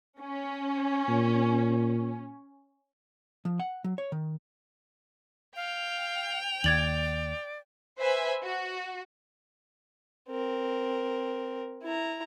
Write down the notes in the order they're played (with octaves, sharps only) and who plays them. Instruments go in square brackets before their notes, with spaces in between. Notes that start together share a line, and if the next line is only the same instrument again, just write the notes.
[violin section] C#4
[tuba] A#2
[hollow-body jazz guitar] F3
F#5
F#3
C#5
D#3
[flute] F5 [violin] G5 F7
[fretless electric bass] D#2 [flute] D5 [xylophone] G#6 A6 F#7
[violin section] B4 C5 E5 G#5
F#4
[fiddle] C4 A#4
E4 A#5